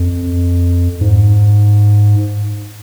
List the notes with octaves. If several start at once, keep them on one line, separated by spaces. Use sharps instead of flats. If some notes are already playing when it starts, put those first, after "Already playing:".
Already playing: F2
G#2